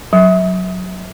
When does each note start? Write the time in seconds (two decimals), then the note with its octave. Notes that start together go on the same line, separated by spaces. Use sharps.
0.13 F#3